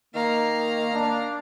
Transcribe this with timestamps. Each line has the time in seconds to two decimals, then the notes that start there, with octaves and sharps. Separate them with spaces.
0.15 D#3 A#3 F5 A#5
0.95 A#3 D4